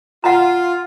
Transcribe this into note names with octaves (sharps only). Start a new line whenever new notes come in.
F4 F#5 A#5